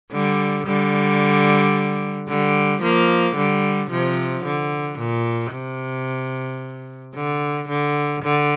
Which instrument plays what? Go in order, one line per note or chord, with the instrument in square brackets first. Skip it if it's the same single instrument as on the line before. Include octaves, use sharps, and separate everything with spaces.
[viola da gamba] D3 G3
D3 G3
D3 G3
F3 A#3
D3 G3
C3 F3
D3
A#2
C3
D3
D3
D3